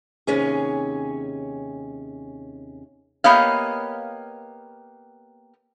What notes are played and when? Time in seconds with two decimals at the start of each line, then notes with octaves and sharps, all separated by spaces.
0.27 D#2 C3 C#4 G#4
3.24 A#3 B3 G4 C#5 D#5 F5